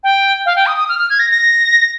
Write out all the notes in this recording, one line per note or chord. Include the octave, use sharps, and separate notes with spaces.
G5
F5
G5
D#6
D#6
F6
F6
G#6
A#6
A#6